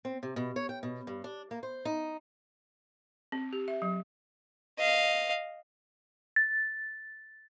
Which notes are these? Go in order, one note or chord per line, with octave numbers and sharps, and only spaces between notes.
C4
C3
B2
C#5
G5
B2
G2
D4
A#3
C5
D#4
C4
G4
E5
F#3
D#5 F5
A6